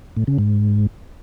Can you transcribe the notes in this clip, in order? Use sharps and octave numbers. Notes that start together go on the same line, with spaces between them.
A2
C#3
G#2